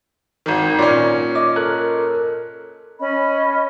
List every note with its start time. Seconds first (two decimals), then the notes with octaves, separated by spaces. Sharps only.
0.46 G#1 D#3
0.79 A#2 C#4 C#5 D5
1.35 D#5 D6
1.56 A4 A#4 F#6
3.00 C#4 D#5 B5